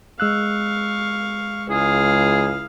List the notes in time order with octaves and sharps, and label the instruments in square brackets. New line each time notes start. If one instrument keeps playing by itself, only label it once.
[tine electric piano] G#3 E6 F#6 [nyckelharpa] F5 C#6
[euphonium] C#2 [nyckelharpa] E4 F5 [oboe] G#4